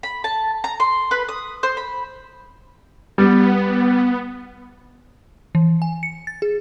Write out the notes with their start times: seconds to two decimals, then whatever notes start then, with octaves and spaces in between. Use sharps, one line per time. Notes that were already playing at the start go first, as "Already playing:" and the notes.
0.03 B5
0.24 A5
0.64 A#5
0.80 C6
1.11 B4
1.29 D#6
1.63 C5
1.77 B5
3.18 G3 B3
5.55 E3
5.82 G#5
6.03 C#7
6.27 A6
6.42 G#4